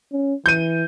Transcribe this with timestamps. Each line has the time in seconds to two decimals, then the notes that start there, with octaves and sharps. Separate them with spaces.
0.13 C#4
0.46 E3 G6 D#7